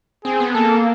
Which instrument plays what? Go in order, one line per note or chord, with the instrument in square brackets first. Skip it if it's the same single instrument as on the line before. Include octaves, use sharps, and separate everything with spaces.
[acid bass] C4 [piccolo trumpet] G#4
[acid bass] B3
[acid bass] A#3 [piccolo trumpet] A4